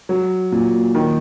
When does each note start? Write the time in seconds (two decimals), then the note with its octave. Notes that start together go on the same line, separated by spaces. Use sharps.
0.09 F#3
0.52 A#2
0.95 D#3